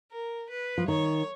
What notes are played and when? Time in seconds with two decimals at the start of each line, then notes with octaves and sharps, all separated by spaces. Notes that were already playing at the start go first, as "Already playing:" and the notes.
0.12 A#4
0.50 B4
0.78 F3
0.88 D#3 C#5